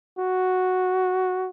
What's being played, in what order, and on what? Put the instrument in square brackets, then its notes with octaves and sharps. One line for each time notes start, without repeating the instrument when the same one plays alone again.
[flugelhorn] F#4